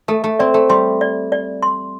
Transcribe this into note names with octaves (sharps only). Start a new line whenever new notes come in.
A3 A4
A3
C4 D5
A3
G3 C6
D5
D5
C6